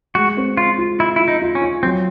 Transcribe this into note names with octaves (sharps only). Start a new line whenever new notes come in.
G#3 F#4
C4
C4 F4
F4
E4 F4
E4 F4
D#4
F4
C#4
F4
F#3 C4